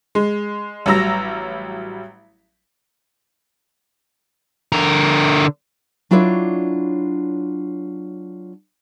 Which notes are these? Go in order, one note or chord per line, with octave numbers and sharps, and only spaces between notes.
G#3
A1 F#3 G3 A#5 E6 A#6
D3 A#4
F#3 D4 E4 F4 C#5 D5